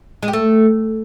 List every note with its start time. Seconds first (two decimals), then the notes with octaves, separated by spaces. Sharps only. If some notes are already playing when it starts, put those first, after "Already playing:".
0.23 G#3
0.28 G4
0.33 A3